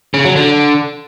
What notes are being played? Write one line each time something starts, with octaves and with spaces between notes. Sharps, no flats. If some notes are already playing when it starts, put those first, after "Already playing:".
C#3
F#3
D3